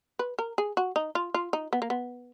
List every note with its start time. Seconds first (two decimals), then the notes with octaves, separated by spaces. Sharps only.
0.19 B4
0.39 A#4
0.58 G#4
0.77 F#4
0.96 D#4
1.15 F4
1.34 F4
1.53 D#4
1.73 B3
1.82 A#3
1.90 B3